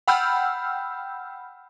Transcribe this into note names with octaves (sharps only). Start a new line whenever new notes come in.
F#5 G5 B5 E6 F6 G6